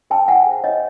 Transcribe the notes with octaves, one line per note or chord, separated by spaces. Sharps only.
A#4 C#5 G5 A5
E4 F#5 G#5
G#4 C5
E4 C#5 D#5